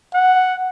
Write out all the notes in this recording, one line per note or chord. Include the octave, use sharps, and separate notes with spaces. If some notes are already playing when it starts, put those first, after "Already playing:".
F#5